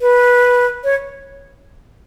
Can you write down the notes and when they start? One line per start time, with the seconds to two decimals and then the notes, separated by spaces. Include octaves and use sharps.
0.01 B4
0.84 C#5